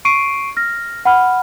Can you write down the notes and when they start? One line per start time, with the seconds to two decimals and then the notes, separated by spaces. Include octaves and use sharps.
0.05 C#6 C7 D7 D#7
0.57 F6 A#6
1.05 F#5 B5 F6